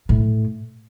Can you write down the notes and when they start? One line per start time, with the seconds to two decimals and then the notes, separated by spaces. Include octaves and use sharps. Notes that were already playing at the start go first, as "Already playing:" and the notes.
0.09 A2